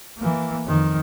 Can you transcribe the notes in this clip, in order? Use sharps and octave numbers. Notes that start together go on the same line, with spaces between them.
E3 A#3
F2 D#3